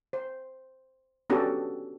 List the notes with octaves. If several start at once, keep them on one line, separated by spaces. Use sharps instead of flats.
C5
B3 C#4 D4 F#4 G4 A4